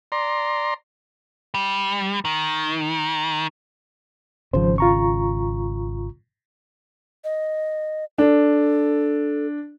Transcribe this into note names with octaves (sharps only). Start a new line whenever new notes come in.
D5 A#5 C6
G3
D#3
G#1 C#3 F3 C5
F4 A#5 C#6
D#5
D4 A4